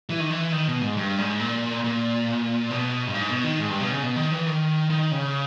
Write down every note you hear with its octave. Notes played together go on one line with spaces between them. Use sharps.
E3
D#3
E3
D#3
B2
G#2
G2
G#2
A#2
A#2
B2
G2
G#2
B2
D#3
G#2
G2
B2
C#3
B2
D#3
E3
D#3
D#3
C#3